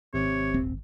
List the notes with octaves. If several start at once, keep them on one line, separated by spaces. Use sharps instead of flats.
G#1 C3 C#5
D#1 C4